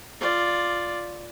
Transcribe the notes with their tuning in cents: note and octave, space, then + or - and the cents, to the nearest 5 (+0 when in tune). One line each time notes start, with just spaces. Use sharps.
F4 +0 D5 +0